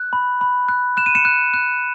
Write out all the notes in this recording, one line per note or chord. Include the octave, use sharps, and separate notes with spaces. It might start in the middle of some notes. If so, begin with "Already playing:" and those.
Already playing: F#6
B5
B5
F#6
F#6 E7
D#7
C#7 E7
F#6
F#6